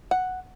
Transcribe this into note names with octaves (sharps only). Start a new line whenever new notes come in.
F#5